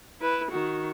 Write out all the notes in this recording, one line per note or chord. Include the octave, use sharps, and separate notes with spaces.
E4 B4
D#3 F#4